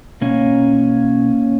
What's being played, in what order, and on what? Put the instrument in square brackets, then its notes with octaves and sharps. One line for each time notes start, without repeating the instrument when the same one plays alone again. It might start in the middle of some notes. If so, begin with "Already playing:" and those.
[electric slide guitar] B2 A#3 C#4